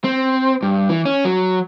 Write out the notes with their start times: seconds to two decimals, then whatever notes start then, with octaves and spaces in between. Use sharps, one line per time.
0.04 C4
0.63 G2
0.89 E3
1.06 C#4
1.25 F#3